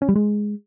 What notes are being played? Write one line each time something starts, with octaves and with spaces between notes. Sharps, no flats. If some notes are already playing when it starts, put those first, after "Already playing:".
C#4
G3
G#3